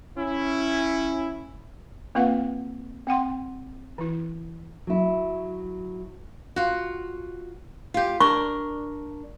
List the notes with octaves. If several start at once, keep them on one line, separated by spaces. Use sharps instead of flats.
C#4 E4
A#3 C4 F4 B4 F5 F#5
C4 F#5 G5 C6
E3 E4
F#3 E4
F4 F#4
F4 G4
D4 A#4 C#6